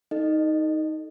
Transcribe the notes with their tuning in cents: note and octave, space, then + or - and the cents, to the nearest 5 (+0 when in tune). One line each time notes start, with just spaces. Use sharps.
D#4 +10 A4 +0 D#5 -25